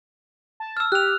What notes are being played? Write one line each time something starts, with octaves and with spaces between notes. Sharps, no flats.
A5
E6 F6
G4 F#6 F7